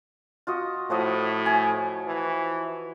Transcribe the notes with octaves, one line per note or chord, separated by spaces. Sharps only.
F4 F#4 D#5
A2 F3 F#4 D#6
G#5
E3